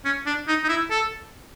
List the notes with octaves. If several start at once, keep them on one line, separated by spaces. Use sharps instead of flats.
C#4
D4
D#4
D#4
E4
A4